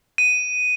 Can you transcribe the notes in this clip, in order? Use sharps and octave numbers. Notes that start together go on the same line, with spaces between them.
D#7